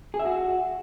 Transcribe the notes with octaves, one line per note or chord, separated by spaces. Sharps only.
G#4
E5
F#4